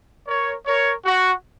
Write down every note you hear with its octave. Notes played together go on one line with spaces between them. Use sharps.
A#4 C#5
A#4 C#5
F#4